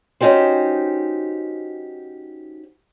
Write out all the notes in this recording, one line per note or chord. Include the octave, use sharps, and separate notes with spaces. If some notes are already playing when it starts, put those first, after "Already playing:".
C#4 D#4 F#4 G4 C5